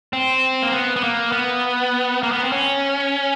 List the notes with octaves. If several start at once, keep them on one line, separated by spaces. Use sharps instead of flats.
C4
A#3
B3
B3
A#3
B3
A#3
B3
C4
C#4